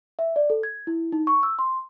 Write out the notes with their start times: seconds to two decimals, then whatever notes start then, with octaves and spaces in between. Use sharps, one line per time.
0.19 E5
0.36 D5
0.50 A4
0.63 G#6
0.87 E4
1.12 D#4
1.27 C#6
1.43 E6
1.59 C6